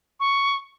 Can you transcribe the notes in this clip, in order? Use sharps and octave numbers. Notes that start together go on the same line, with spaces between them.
C#6